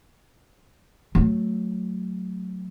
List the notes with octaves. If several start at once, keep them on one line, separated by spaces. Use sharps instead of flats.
F#3 A3